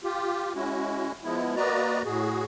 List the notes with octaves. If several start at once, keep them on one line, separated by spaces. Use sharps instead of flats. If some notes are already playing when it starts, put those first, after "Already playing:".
F4 G4
G#3 C#4 E4 F#4
F3 G#3 B3 E4
A#3 F#4 B4 D5 D#5 A#5
A2 F#4 G#4